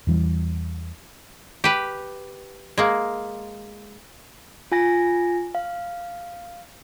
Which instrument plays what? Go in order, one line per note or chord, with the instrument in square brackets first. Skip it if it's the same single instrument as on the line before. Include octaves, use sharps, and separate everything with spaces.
[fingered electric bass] E2 E3 G3
[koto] G4 B4
G#3 A#3
[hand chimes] F4 G#5 A#6
F5